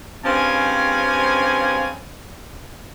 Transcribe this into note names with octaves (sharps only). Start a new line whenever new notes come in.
G2 C#3 F3 C4 C#4 G#5